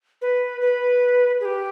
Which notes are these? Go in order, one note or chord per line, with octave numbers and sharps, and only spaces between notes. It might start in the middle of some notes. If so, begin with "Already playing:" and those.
B4
B4
G#4
G4